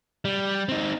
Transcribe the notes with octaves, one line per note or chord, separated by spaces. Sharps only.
G3
C4 D#4